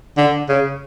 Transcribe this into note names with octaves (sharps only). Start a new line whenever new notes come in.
D3
C#3